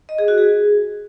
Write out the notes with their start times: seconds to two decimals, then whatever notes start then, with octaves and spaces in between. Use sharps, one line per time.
0.09 D#5
0.18 G#4
0.28 F#4
0.38 G#4